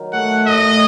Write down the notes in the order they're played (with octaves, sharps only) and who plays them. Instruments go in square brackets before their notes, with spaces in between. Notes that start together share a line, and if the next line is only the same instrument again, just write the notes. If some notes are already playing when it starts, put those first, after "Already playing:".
Already playing: [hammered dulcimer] D#3 F#3
[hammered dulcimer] A3 [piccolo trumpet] F#5
[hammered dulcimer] A2 [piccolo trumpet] D#5